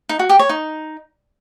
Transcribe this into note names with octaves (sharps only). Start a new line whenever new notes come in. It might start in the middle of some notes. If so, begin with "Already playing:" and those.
D#4
F#4
G4
C#5
D#4